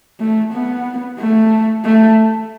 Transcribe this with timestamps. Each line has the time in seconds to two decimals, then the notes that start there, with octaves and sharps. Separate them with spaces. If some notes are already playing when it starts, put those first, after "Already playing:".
0.20 A3
0.53 B3
1.19 A3
1.85 A3